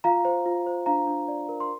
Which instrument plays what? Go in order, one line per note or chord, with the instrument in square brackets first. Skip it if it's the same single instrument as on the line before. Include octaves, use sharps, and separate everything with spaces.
[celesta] F4 F5 A#5
C5
F4
C5
D4 F5 A#5
D4
D5
A#4
C6